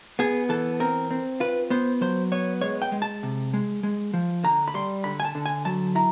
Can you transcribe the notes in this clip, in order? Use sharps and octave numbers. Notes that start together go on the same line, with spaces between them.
B3 G#4
E3 A4
C4 A#4
C4
F4 B4
B3 C5
F#3 C5
B3 C#5
G#3 C#5
G5
G#3
A5
C3
G#3
G#3
F3
D3 A#5
B5
G3 C6
D3 B5
G#5
A5
D3
G#5
F#3 A5
E4 A#5